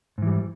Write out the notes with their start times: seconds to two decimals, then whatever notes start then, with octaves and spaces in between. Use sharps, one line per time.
0.18 G#2
0.22 E3
0.27 G3